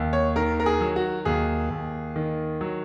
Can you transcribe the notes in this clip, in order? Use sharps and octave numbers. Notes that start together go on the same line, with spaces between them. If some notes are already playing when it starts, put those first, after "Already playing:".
Already playing: D#2
C#5
D#3 A#4
A#4
G#4
F#3
F#4
D#2 G#4
D#2
D#3
F#3